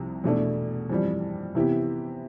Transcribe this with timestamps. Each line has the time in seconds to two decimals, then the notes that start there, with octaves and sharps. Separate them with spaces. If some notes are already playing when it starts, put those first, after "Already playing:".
Already playing: C2 C3 F3
0.24 E2 B2 A3 D4
0.90 F2 E3 G3
1.55 C3 E3 B3 E4 G4